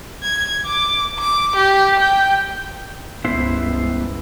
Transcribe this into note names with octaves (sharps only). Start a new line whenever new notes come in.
G#6
D6
D6
G4
G5
C#2 G2 B3 E4 C5